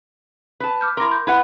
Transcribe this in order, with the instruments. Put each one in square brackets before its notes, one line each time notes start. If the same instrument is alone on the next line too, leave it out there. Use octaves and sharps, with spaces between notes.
[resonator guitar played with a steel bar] B4 A5
[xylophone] D6 F6 G6
[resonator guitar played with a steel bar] E4 A#4 [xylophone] C6 D6 A#6
[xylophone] G6
[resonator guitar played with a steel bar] E4 B4 F#5